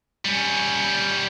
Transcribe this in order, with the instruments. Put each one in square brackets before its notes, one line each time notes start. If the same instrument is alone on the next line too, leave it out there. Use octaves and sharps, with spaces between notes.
[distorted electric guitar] G3 C#4